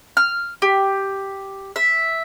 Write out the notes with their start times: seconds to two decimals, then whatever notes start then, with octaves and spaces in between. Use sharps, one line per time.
0.17 F6
0.62 G4
1.76 E5